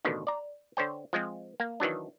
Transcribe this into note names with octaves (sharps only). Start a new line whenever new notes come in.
A1 B2 D3 D#3
D5 A#5
D3 C5 C#5 G5
F3 G#3 C4
A#3
D#3 E3 F#3 D4